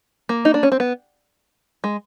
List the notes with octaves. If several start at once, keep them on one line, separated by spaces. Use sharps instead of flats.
A#3
D#4
D4
C#4
C4
B3
G#3